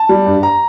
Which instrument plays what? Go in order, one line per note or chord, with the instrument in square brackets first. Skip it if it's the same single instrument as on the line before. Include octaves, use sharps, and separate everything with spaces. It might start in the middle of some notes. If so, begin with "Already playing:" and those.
Already playing: [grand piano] A5
G3
G2
A#5